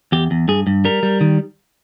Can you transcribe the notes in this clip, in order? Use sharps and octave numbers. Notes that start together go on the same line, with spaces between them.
E2 G4
E2
G2 G#4
G2
G3 A#4
G3
D#3